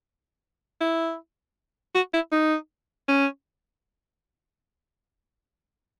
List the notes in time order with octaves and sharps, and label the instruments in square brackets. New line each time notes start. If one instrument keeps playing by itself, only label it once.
[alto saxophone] E4
F#4
E4
D#4
C#4